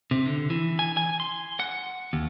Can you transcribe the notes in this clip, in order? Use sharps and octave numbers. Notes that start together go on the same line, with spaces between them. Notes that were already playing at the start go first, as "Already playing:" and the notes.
C3
D3
E3
G#5
G#5
C6
F#5
D#2